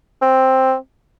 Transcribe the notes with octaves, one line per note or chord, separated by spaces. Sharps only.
C4